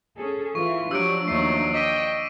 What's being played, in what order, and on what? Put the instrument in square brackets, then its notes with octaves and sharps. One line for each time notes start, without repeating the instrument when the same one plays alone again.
[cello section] C#4 G#4 A4
[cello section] E3 E4 F4 [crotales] C#6
[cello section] F3 D4 [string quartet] F#3 [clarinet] G4 [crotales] E6 D7
[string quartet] D#2 F#3 D#4 [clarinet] A3 [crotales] C#6 C7
[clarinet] D#5 [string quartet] G5 [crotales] D6 B6 D#7